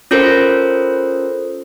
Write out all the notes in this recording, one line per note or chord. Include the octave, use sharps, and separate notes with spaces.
C#4 F4 A4 A#4 C5